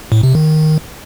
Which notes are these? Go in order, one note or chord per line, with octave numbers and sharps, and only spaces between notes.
A2
C3
D#3